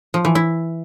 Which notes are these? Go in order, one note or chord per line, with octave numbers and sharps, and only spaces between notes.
F3
E3
E4